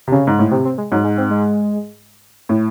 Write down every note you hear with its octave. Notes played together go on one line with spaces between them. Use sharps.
C3
C#3 C#4
G#2
A2
C3 C4
C4
G#3
G#2 F#3
G#3
C4
G#3
A2